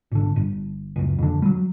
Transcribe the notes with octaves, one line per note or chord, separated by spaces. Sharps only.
G#1 D3
G1
C#2 F#2
F2 D3
F#3 G3